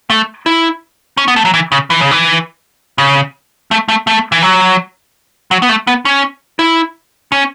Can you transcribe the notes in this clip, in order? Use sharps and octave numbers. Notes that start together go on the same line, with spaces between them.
A3
E4
C#4
B3
A3
F#3
E3
C#3
E3
C#3
E3
C#3
A3
A3
A3
E3
F#3
F#3
B3
A3
B3
C#4
E4
C#4